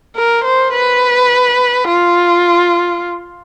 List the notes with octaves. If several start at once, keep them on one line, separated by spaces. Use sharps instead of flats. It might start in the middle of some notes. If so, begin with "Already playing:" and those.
A#4
C5
B4
F4